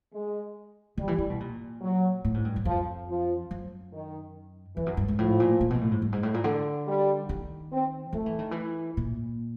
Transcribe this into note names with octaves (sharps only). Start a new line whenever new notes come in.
G#3
D#3 G3
E3
E3
B2
A#2
F#3
A2
G#2
G2
F#2
F2 F3
F3
F#2
D#3
F2 E3
F#2
G2
G#2
A2 F3
A#2
A#2
B2
A2
G#2
G2
G#2
A2
A#2
D3
G3
D#3
C4
F3 A3
E3
D#3
E3
A#2